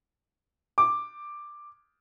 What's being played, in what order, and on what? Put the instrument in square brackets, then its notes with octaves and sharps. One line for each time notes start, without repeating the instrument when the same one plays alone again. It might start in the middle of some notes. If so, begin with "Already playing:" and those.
[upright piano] D6